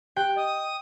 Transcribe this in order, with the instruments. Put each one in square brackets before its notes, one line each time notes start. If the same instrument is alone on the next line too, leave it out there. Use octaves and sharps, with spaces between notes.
[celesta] G4 [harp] G5 [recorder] F#6
[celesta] D#5 [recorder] D#6